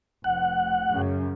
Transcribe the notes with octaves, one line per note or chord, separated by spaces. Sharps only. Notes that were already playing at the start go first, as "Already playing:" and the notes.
F1 F#5
F#2 C#3